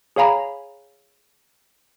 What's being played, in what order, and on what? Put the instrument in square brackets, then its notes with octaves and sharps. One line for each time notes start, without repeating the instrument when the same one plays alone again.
[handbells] G#4 C#5 F5 G#5 A#5 B5